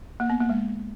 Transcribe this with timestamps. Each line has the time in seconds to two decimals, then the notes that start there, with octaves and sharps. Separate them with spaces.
0.20 A#3
0.30 B3
0.40 A#3
0.50 G#3